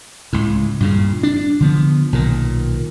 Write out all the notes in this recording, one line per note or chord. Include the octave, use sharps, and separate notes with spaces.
C#2 A2
G2 A#2 C#3
D4
D3 F3 B3
B1 A#2 D#3